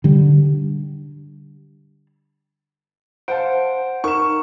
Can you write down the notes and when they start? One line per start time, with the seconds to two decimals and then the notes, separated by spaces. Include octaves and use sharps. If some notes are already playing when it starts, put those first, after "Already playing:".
0.04 D3 G3
3.28 C5 F5 F#5 A5 D7
4.04 D#4 A#4 C#6 E7